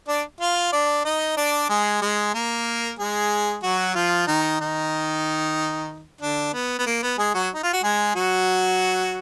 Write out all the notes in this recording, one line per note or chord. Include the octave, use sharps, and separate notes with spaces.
D4 D5
F4 F5
D4 D5
D#4 D#5
D4 D5
G#3 G#4
G#3 G#4
A#3 A#4
G#3 G#4
F#3 F#4
F3 F4
D#3 D#4
D#3 D#4
D3 D4
B3
B3
A#3
B3
G#3 G#4
F#3 F#4
D#4
F4
F#4
G#3 G#4
F#3 F#4